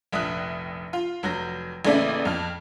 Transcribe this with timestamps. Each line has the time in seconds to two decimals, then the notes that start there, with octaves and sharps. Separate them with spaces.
0.12 F1 A#1 E5 D#6 F#6
0.93 F4
1.23 F1 F#3 G6 A#6
1.85 A1 C#3 A3 A#3 D5 E5
2.25 F2 F6